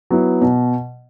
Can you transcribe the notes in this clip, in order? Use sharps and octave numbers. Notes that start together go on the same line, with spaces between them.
F#3 B3 E4
B2